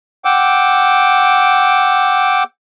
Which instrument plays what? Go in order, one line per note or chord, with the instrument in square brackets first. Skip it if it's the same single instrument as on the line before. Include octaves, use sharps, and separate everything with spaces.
[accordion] F#5 G5 D6 E6